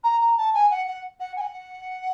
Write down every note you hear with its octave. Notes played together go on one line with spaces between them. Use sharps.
A#5
A#5
A5
G#5
F#5
F#5
F#5
G#5
F#5